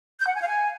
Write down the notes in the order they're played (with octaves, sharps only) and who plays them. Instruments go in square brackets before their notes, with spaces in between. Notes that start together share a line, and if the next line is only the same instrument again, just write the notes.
[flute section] G6
F#5
G#5
F5
G#5